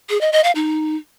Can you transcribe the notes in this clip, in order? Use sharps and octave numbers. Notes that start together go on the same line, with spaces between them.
G#4
D#5
D#5
F5
D#4